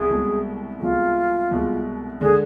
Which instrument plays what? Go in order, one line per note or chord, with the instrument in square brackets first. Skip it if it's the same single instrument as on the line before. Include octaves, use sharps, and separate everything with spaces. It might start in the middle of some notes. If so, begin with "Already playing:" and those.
Already playing: [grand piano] C2 B2 [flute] G#4
[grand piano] C2 B2 G#3
[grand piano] C2 B2 G#3 [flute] F4
[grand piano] C2 B2 G#3
[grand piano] D3 G#3 D4 [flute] G#4